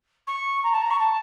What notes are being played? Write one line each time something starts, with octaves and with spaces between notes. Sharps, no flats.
C#6
A#5
A5
A#5
C#6
A5